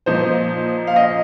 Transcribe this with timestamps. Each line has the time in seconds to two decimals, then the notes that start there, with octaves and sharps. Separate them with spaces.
0.06 A#2 F3 D#4 C5
0.87 F5
0.96 D#5